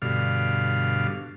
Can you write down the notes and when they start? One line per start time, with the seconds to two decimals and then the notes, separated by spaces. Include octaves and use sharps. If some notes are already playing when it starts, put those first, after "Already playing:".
0.02 G2 B2 D3 F5 F6